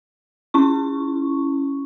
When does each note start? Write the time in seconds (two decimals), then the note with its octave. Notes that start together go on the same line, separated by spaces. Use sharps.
0.54 C#4 E4 C#6